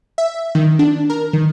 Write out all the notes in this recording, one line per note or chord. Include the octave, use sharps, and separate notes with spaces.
E5
D#3
D4
A#4
D#3